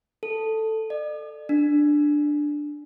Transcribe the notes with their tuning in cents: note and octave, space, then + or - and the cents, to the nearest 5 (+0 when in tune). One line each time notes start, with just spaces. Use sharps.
A4 +5
D5 +40
D4 +5